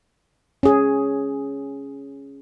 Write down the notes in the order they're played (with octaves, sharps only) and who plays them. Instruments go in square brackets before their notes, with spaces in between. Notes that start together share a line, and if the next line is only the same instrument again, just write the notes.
[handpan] C#4 G#4